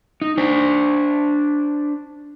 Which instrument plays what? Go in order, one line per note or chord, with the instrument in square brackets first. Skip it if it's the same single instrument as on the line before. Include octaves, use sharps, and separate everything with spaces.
[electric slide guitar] D#4
D4 C5